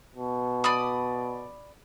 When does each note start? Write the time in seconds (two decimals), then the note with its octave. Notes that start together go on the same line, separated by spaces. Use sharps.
0.15 B2
0.64 D5 B5 D#6